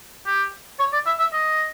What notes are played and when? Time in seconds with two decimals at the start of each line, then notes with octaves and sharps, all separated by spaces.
0.27 G4
0.79 C#5
0.93 D5
1.06 E5
1.19 E5
1.33 D#5